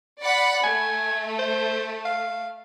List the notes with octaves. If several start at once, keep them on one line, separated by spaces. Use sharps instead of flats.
D5 F#5 B5
A3 G#5
C5
F5